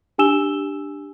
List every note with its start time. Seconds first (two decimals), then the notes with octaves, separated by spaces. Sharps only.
0.18 D4 G4 G#5 E6 E7 G7